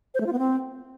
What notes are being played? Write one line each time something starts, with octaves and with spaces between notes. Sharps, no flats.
C5
A3
F4
B3
C4